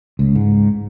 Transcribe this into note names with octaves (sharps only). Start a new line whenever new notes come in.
C#2
G#2